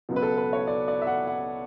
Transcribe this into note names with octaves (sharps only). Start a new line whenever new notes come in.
C#2 B2 F#3
B4
A4
B4
C#5
D5
D5
E5
F#5
F#5